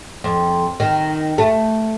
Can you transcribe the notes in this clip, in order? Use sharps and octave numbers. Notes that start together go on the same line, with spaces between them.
F2
D#3
A3